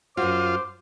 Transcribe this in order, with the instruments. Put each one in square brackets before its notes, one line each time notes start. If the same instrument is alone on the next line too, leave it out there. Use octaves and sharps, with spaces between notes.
[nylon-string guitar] F#2 F#4 [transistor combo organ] F4 [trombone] C5 [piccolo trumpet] D6